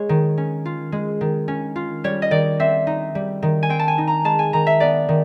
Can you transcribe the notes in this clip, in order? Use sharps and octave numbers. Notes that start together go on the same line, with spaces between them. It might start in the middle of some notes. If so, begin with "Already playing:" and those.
Already playing: G#3 C#5
D#3
C#4
F4
G#3
D#3
C#4
F4
G3 C#5
D#5
D#3 D5
C4 E5
D#4
G3
D#3
G#5
C4 G5
A5
G#5
D#4
A#5
G#3 A5
G#5
D#3 A#5
E5
B3 D5
D#3